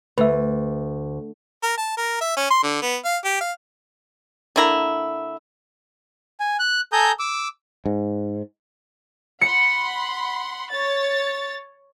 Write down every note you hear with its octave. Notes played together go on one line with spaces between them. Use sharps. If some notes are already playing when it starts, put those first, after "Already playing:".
D2 B4 E5
A#4
A5
A#4
E5
C#4
C6
D3
B3
F5
G4
F5
D3 A#3 E4 A#5
G#5
F#6
A4 G#5 A#5 D#6 G6
D6 E6
G#2
F#5 B5 C6 C#7
C#5 A6